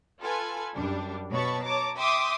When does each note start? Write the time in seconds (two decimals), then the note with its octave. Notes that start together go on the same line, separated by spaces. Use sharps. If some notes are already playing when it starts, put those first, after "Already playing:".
0.21 F4 A4 B4 G#5
0.74 F#2 G3 D4
1.31 B2 B3 C#5 A5 B5 C#6
1.64 C#5 A5 A#5 D6
1.97 E5 G5 C6 D6 D#6